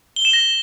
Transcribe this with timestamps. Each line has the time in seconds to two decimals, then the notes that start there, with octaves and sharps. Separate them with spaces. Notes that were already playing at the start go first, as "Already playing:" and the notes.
0.16 G7
0.25 E7
0.33 A#6